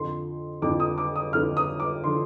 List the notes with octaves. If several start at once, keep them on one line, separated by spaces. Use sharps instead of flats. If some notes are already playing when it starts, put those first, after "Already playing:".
Already playing: F2 D3 F3 C6
F2 D3 F3 D6
D#6
D6
D#6
F2 D3 F3 F6
D#6
D6
D3 F3 C6